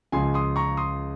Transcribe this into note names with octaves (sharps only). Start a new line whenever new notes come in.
C#2 C#3 F3 G#5 C6
C6 D#6
A#5 C#6
C6 D#6